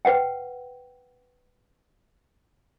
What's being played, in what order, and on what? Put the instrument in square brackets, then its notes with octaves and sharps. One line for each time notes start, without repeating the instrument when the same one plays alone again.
[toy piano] B4 F#5 G5